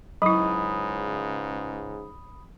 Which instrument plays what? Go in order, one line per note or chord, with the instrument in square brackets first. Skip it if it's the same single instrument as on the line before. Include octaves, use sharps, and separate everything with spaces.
[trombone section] C#2 G#2 C#3 [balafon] F#3 E4 [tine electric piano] B5 D#6